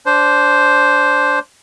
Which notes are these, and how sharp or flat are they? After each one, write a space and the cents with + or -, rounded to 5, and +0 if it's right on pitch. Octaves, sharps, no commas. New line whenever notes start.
D4 -20 C5 +0